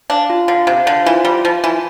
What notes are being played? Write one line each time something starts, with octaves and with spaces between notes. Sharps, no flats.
D4 F5
F4
D3 F5
C3 F5
D3 C5
E3 F4
G3 F4
F3 F4
E3 C5